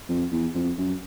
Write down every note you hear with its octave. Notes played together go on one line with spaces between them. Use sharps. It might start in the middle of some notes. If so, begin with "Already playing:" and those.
F2
E2
F2
F#2